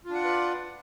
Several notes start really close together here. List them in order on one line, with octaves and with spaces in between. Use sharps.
F4 D4 F#5 D5 B4